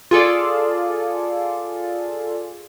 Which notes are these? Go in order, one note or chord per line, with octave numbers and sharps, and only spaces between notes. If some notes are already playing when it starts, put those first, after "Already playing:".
F4 G#4 A4 D5